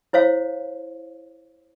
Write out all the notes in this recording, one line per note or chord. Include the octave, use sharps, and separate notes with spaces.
E4 C5 C#5 F5